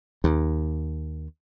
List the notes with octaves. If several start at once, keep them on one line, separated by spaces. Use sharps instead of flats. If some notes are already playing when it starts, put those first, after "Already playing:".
D#2